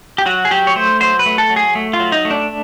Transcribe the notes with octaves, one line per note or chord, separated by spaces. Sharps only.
G4
F#3 F#4
G#4
F#3 G4
C#5
A3 C5
F#3 C5
B4
A3
A4
F#3
G#4
A3
F4
F#3
D#4
A3
D4